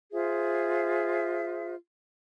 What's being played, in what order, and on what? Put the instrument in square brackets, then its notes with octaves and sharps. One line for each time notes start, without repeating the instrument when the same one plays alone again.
[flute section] F4 G#4 C5 E5